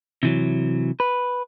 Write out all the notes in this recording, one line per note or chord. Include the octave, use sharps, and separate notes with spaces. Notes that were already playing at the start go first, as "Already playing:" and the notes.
C3 E3 F#3
B4